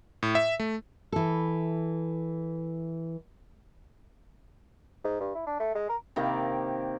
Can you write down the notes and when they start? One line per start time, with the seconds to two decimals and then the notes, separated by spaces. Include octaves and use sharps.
0.23 A2
0.35 E5
0.60 A3
1.12 E3 A4
5.04 G#2
5.20 G2
5.35 E4
5.47 D4
5.60 A3
5.75 G#3
5.89 A#4
6.16 C3 D#3 A#3